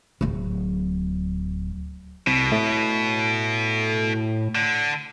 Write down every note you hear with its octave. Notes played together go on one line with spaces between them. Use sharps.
D1 F#3
C2 B2
A2
D3